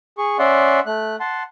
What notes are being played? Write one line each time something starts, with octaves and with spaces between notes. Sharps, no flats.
G#4 C#6
C#4 D5 E5 F#5 C6
A3 F#6
F#5 A5 C6